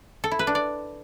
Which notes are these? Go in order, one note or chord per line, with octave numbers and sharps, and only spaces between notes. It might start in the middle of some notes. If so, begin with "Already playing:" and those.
A4
E4
B4
D4
D5